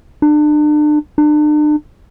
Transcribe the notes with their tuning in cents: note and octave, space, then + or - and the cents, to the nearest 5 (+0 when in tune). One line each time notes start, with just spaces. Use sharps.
D4 +35
D4 +40